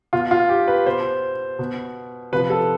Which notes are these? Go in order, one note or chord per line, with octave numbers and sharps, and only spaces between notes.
B2 F4
F4
G4
B4
B2 C5
B2
C3 F3 B4
A4